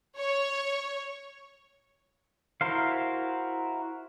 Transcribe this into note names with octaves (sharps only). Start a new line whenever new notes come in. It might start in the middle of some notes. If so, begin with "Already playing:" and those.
C#5
E4 F#4 A#4 C5 F5